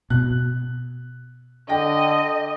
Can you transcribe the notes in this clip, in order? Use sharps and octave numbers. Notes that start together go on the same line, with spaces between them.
B2 F#6
D3 D#5 G5 A#6